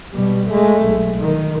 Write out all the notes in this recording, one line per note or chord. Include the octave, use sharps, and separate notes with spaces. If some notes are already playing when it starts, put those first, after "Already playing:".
B2 G3
G#3 A3
B1
D#3